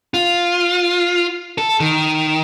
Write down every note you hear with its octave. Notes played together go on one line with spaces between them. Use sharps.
F4
A4
D#3